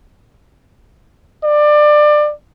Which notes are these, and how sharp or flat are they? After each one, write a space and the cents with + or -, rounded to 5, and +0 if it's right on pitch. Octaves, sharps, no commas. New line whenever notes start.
D5 +25